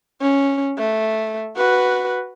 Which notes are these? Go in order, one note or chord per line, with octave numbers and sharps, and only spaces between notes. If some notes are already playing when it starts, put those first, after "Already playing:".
C#4
A3
F#4 B4